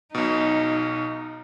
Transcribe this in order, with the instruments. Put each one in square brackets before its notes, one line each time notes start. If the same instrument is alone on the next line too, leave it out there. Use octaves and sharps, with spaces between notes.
[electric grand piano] B1 B2 [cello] D#4